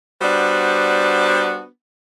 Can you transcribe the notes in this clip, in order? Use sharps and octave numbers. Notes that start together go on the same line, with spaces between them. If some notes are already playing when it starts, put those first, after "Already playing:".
G3 B3 D4 F#4 C5